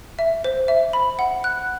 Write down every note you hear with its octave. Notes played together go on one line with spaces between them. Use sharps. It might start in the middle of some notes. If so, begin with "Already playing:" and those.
E5
C5
E5
B5
F#5
F#6